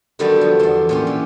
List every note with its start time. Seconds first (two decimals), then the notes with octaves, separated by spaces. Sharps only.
0.19 D3 D#3 F#3 G3 B3 D4
0.41 F3
0.59 E2 D5
0.89 A#2 C#4 G4
1.07 E3